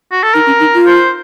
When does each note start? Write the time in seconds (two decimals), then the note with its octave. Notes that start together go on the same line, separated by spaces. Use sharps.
0.12 F#4
0.23 A4
0.34 D#4 A#4
0.47 C#4
0.60 D#4
0.74 F4
0.87 C5